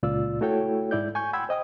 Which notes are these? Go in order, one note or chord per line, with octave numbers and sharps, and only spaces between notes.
C#2 A#2 F4 D5 E6
A3 E4 F#4 A4 C#5 G5
G#2 E4 D5 G6
G#5 C#6 G6
F#5 G5 B5 C6 E6 G#6
C5 D#5 G5 D#6